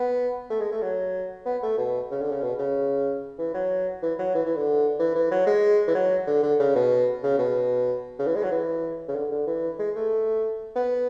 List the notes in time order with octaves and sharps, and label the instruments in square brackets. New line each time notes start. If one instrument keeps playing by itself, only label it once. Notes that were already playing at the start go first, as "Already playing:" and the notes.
Already playing: [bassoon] B3
A3
G#3
A3
F#3
B3
A3
B2
C#3
D3
C#3
B2
C#3
E3
F#3
E3
F#3
E3
E3
D3
E3
E3
F#3
G#3
E3
F#3
D3
D3
C#3
B2
C#3
B2
C#3
E3
G#3
F#3
E3
C#3
D3
D3
E3
G#3
A3
B3